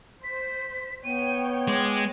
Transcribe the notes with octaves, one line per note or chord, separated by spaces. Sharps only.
C5 B6
B3 C#5 G5 D#7
G#3 D6